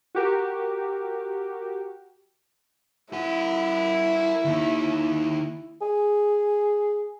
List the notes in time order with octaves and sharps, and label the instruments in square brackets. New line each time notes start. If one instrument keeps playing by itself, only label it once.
[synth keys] F#4 G4 A#4
[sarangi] E4 [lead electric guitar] A#4 F#5
[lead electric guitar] D#2 D#3
[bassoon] G#4